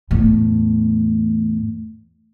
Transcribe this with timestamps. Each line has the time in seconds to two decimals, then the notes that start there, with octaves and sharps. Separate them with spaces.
0.11 E2 A2